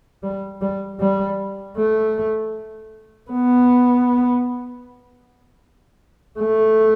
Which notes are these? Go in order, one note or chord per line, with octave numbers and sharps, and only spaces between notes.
G3
G3
G3
A3
B3
A3